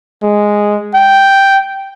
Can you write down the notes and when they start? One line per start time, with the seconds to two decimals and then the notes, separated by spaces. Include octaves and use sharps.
0.23 G#3
0.94 G5